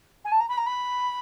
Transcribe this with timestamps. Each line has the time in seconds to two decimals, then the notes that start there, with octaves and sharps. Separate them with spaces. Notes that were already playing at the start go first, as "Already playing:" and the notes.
0.25 G#5
0.32 A5
0.40 A#5
0.49 B5
0.57 A#5
0.66 B5